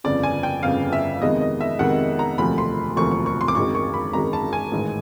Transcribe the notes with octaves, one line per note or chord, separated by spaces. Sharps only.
G1 F2 C#3 D5
G#5
G5
G1 F2 C#3 F5
E5
F2 C3 D#3 G#3 B3 D#5
D#5
E5
F2 C3 D#3 G#3 B3 F#5
A#5
E1 D2 C3 F3 A3 B5
C6
E1 D2 C3 F3 A3 C#6
C#6
C#6
C6
D6
G#1 F#2 D#3 G#3 C#6
C#6
B5
G#1 F#2 D#3 G#3 A#5
A5
G#5
A1 G#2 D#3 G#3